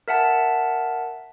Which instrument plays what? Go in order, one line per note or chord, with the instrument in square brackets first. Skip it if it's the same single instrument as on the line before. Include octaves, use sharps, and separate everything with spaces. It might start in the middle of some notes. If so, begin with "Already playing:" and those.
[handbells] A#4 E5 F#5 A5